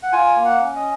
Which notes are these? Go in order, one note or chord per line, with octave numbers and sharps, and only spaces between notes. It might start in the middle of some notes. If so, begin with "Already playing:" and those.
F#5
F4 G#5
A#3
F#5
C#4
D#5